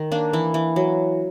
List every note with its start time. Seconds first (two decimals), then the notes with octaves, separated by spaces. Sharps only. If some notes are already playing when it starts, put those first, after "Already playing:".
Already playing: D#3
0.11 A#3 D4
0.33 E3 E4
0.54 E3
0.76 F#3